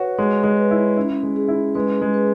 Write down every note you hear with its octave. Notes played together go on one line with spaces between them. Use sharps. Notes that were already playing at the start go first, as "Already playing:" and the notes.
Already playing: F#4 B4 C#5
G#3 C#5
G#3
B4
E4
C#4 E4
G#3
G#4
E4
G#3 B4
G#3
B4